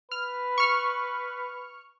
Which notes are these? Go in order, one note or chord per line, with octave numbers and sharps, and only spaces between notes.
B4 F6
C#6 F6